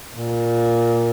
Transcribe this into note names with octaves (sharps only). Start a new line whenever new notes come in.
A#2